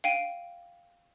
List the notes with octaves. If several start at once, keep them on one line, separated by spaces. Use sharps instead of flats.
F5 G5 D#7